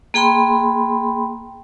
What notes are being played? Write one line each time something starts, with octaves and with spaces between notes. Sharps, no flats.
A#3 G#4 G5 B5 C6